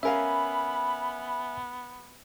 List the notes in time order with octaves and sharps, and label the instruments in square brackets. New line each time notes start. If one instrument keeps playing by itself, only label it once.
[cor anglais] B3 [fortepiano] C#4 A#4 F5 [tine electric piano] E5 G#5 [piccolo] B5